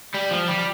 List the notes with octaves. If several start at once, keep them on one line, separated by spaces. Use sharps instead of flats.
G3
F3
G3